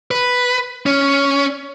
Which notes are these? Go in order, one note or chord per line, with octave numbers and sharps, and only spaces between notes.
B4
C#4